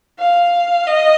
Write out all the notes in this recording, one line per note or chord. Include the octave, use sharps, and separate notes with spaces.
F5
D#5